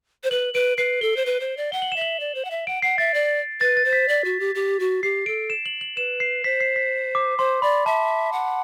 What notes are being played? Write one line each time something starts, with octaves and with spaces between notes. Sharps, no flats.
C5
B4 F#7
B4 D7
B4 C7
A4 G7
C5
B4
C5
D5
F#5 G7
F#7
E5 E7
F#7
D5
C5
F#5
E5
F#5 D7
F#5 C7
E5 A6
D5
B4 A6
A6
C5
B6
D5
F#4
G4
G4
F#4
G4 C7
A4 D7
E7
F#7
F#7
B4 E7
C7
C5 B6
C7
B6
D6
C5 C6
D5 B5
E5 A5
F#5